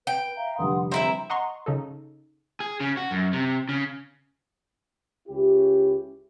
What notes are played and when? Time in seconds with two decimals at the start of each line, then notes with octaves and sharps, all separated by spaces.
0.07 B4 G5
0.36 E5 F5 A#5
0.58 F1 D3 G3 F#5 C6 D#6
0.92 C4 E4 E5 A#5
1.30 D#5 F#5 A#5 C6 C#6
1.66 C#3 D#4 A4
2.60 G#4
2.80 C#3
2.97 F#4
3.11 F#2
3.33 C3
3.69 C#3
5.28 C#2 C#4 E4 G4